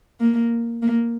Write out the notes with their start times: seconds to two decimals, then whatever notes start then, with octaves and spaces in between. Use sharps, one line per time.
0.20 A#3
0.82 A#3